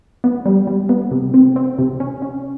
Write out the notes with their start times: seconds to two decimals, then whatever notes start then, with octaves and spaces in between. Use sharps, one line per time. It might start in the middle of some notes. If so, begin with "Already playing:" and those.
0.24 B3
0.46 G3
0.67 G3
0.89 B3
1.11 C3
1.34 C4
1.56 C4
1.79 C3
2.00 C#4
2.22 C#4